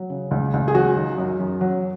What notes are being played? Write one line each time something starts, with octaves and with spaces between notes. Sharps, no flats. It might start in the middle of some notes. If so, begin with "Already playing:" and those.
Already playing: F#3
C#3
C#2
C#2
G#4
F#3 F#4
D#3
F#2
F#2
F#3